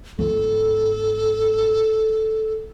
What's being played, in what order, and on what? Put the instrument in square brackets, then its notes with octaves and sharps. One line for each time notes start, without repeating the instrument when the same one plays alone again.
[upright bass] G1 G#2 [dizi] A4